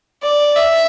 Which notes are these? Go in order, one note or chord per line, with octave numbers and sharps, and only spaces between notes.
D5
E5